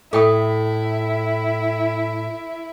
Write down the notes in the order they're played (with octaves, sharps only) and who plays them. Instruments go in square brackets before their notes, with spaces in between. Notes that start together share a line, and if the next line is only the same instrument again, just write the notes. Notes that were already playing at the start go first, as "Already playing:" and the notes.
[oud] A2 [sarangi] E4 [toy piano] A4 G5 D#6